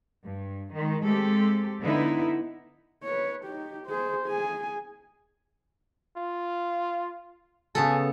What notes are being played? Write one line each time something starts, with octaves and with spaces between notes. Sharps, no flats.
G2
D#3 G#3
G#3 A3 C4 G4 A4
D3 B3 D#4 E4
B4 C#5
D#4 G4
G#4 C5
G#4 G#5
F4
C#3 B3 A4 G#5